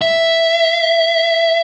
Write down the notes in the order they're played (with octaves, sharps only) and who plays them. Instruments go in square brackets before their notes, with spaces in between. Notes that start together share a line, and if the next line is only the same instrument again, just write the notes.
[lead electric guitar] E5